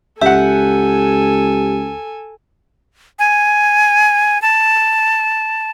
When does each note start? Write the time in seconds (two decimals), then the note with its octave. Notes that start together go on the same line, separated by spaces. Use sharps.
0.21 C#2 G4 A4 E5 F#5 G#5
3.19 G#5
4.42 A5